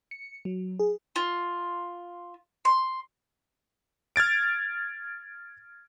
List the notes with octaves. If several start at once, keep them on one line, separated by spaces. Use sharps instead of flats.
C#7
F#3
G#4
F4
C6
F6 G#6 A6 D7